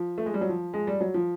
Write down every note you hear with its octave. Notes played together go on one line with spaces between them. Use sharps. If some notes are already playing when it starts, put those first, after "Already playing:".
Already playing: F3
A3
G#3
G3
F#3
F3
G#3
G3
F#3
F3